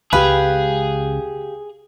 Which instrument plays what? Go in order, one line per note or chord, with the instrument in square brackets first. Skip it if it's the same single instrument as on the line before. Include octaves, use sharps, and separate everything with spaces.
[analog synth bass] C#2 [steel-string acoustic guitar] G4 F5 [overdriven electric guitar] G#4 [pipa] B4